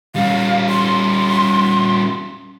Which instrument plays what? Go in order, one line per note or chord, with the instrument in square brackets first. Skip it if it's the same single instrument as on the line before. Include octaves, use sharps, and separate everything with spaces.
[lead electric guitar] G3 C#4 [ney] F5
[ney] C6